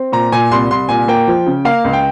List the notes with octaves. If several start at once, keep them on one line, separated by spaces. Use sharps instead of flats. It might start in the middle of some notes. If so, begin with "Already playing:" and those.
Already playing: C4
A#2 A#5
A#2 G#5
C2 C6
C2 C6
A#2 G#5
A#3 G5
F3
C#3
A#3 F5
C#2
G5